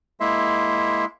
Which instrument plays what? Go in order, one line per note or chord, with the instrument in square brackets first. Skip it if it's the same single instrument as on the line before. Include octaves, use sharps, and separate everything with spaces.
[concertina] G#3 A#3 E4 E5 C6